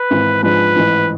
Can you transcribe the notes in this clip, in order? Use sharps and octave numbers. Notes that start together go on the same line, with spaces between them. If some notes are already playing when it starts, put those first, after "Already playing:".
Already playing: B4
G#1 G#2 E3
G#2 F3 G#3 D4 B4
A1 G#2 E3